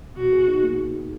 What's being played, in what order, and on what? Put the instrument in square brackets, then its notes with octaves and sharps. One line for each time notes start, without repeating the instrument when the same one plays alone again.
[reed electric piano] B2 [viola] F#4
[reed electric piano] G#4
D#4
A#3